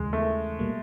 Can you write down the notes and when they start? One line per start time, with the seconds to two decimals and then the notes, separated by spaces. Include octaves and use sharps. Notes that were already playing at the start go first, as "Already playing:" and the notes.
Already playing: D#2 C#3 E3 G#3
0.13 A3
0.59 B2 G3 A#3